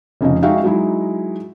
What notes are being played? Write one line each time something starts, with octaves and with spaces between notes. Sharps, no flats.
F1 C#3 F3 D#5
G#3 D#4 F#4 E5 F5 G5
F#3 G#3 D#4 E4